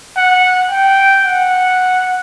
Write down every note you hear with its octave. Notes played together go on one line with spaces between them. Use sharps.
F#5
G5
F#5